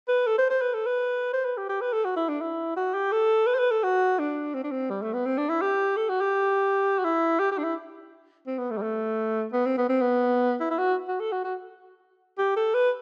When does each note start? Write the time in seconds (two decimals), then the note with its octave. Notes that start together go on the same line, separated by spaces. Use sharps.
0.09 B4
0.27 A4
0.38 C5
0.50 C5
0.62 B4
0.74 A4
0.86 B4
1.33 C5
1.45 B4
1.57 G4
1.69 G4
1.81 B4
1.93 A4
2.04 F#4
2.16 E4
2.28 D4
2.41 E4
2.76 F#4
2.94 G4
3.12 A4
3.47 B4
3.54 C5
3.59 B4
3.71 A4
3.83 F#4
4.19 D4
4.54 C4
4.64 D4
4.72 C4
4.90 G3
5.02 A3
5.14 B3
5.25 C4
5.38 D4
5.49 E4
5.61 G4
5.96 A4
6.09 F#4
6.21 G4
6.99 F#4
7.04 E4
7.39 G4
7.51 G4
7.58 D4
7.63 E4
8.47 C4
8.58 B3
8.70 A3
8.78 G3
8.82 A3
9.53 B3
9.66 C4
9.77 B3
9.89 C4
10.01 B3
10.60 E4
10.71 E4
10.78 F#4
11.08 F#4
11.20 A4
11.32 F#4
11.44 F#4
12.38 G4
12.56 A4
12.74 B4